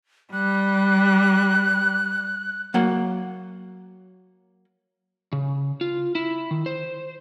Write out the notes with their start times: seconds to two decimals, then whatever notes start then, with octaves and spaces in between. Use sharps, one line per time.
0.33 G3 F#6
2.74 F#3 A#3 F#5
5.33 C#3
5.81 F4
6.15 E4
6.51 D#3
6.66 C5